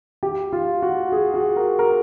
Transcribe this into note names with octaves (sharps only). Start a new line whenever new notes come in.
G4
F4
F#4
G#4
F#4
A#4
A#4